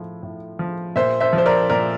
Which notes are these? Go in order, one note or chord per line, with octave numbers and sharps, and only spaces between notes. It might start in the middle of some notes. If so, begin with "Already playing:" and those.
Already playing: A2 F3
A2
F3
A#2 C5 E5
C5 E5
F3
C5
A#4 D5
A#2 A#4 D5